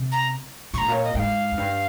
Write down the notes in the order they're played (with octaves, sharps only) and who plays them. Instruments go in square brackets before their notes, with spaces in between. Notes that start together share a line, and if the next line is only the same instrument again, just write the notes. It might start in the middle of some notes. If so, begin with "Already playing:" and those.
Already playing: [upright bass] C3
[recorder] A#5
[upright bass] A#2 [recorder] C#6
[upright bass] G#2 [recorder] A#5
[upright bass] A#2 [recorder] C#5
[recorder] D#5
[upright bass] G#2 [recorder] G5
[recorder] F5
[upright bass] F2
G2